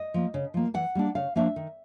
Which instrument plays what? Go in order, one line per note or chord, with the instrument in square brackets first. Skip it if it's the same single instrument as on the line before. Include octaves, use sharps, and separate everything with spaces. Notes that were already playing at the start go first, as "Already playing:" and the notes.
Already playing: [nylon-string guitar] D#5
F3 A#3
C#3
F3 A#3
E3 F#5
G3 A#3 D4
C#3 F5
F3 A#3 D4 E5
D#3